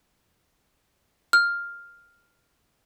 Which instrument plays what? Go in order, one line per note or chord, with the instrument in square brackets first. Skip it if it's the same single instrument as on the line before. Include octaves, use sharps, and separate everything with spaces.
[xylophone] F6